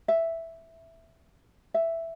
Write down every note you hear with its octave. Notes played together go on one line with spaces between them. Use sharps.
E5
E5